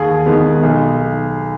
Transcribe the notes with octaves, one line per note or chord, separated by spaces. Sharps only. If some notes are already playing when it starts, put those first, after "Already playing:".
Already playing: D#2 G#4
D#3 G#3 B3
B1